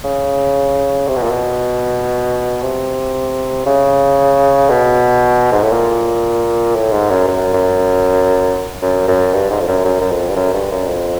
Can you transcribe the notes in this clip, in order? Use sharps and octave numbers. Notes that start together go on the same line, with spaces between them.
C#3
C3
B2
A#2
B2
C3
C#3
B2
G#2
A2
A#2
A2
G#2
F#2
F#2
F#2
F#2
F#2
G2
G#2
F2
F#2
F#2
F#2
F2
G2
F#2
G2
F#2
F2